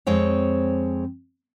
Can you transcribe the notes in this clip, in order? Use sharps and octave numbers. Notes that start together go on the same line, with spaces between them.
F2 G#3 C4 C#5